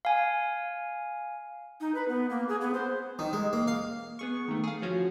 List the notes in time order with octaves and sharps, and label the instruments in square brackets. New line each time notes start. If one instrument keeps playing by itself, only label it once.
[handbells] F5 G#5
[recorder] D#4
B4
B3
A#3
G#4
B3
C5
[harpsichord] D#3
G#3
A#3
F5
[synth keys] B3 G#4 C#6
D#3 A3
G#4 F5
F3 C#4 F#4